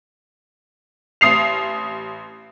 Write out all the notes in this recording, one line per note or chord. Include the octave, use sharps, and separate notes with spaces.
A1 D#6 C7 F7